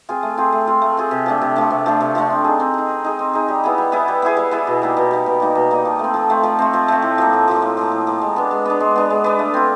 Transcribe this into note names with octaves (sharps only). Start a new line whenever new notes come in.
C4 F4 G#4
A3
C4 F4 G#4
A3
C4 F4 G#4
A3
C4 F4 G#4
C3
F3 A3 D4
C3
F3 A3 D4
C3
F3 A3 D4
C3
F3 A3 D4
C4
D#4 G#4
C4
D#4 G#4
C4
D#4 G#4
C4
D#4 G#4
G3
B3 E4 G#4
G3
B3 E4 G#4
G3
B3 E4 G#4
G3
B3 E4 G#4
B2
G3 A#3 D#4
B2
G3 A#3 D#4
B2
G3 A#3 D#4
B2
G3 A#3 D#4
F3
A3 C4
F3
A3 C4
F3
A3 C4
F3
A3 C4
A2
F3 A#3
A2
F3 A#3
A2
F3 A#3
A2
F3 A#3
G#3
B3 D4
G#3
B3 D4
G#3
B3 D4
G#3
B3 D4
A3
C4 F4